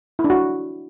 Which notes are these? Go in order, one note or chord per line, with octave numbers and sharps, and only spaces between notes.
E4
D4
F#4